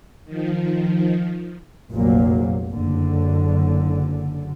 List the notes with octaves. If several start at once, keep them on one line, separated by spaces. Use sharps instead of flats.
D#3 F3
F1 A#1 A#2 F#3 A#3
F#1 D3